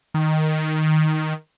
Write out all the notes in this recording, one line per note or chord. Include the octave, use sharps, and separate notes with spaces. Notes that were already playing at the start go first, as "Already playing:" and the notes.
D#3